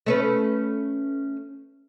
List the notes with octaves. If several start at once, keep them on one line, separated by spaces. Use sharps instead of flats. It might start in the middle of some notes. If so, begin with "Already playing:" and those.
A3 C#4 B4